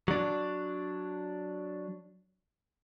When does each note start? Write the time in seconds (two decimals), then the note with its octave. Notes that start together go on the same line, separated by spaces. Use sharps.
0.08 F#3 D4